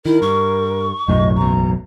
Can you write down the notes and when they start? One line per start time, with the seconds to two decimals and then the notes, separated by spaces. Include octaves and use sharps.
0.05 D#3 E4 A#4
0.22 G2 C#6
1.08 F#1 B1 F#2 A2 F#3 D#5
1.36 A1 B2 A#5